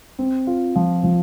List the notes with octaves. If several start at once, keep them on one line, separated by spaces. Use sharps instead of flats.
C4
F4
F3
F3